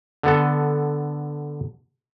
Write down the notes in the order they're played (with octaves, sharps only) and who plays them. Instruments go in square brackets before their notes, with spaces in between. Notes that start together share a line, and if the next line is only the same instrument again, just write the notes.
[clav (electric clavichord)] D3 B3 A4